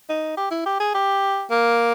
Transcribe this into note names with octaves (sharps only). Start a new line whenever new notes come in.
D#4
G4
E4
G4
G#4
G4
A#3